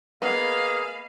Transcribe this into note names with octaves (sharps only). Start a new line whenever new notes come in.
A#3 B3 G#4 D#5 F5 B5